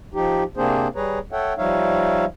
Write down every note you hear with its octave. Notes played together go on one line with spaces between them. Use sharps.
F3 D#4 G4
C3 A#3 C4 D4 G#4 C5
G3 G#4 B4 C#5 A#5
A4 C#5 E5 F#5 G5
F3 G3 D#4 C#5 E5 F5